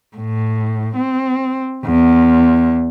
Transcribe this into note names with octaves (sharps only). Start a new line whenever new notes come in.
A2
C4
E2